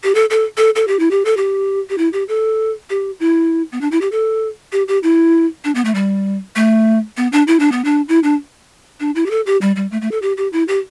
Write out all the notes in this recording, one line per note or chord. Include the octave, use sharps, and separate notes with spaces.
G4
A4
A4
A4
A4
G4
E4
G4
A4
G4
G4
E4
G4
A4
G4
E4
B3
D4
E4
G4
A4
G4
G4
E4
D4
B3
A3
G3
A3
B3
D4
E4
D4
B3
D4
E4
D4
D4
E4
G4
A4
G4
G3
G3
A3
A3
A4
G4
G4
E4
G4